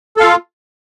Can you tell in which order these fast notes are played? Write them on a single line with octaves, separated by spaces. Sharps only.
A4 F5 F4